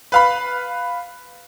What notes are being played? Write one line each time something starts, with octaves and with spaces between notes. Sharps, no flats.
B4 F5 B5